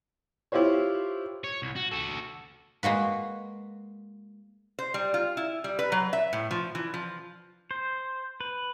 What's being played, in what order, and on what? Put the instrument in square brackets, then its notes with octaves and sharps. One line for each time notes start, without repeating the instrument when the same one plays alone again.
[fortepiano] E4 F4 G4 C5 C#5
[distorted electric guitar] C#5
C2
F#4
F#4 A4
[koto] G#3 A#3 F#4 B4
[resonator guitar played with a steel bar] C5
G3
F4
E4
G3
B4
F#3
E5
A2
F3
E3
F3
[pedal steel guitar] C5
B4